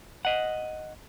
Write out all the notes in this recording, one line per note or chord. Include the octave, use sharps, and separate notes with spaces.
D#5 F#5